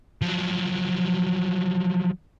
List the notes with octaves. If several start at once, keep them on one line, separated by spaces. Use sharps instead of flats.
F3 F#3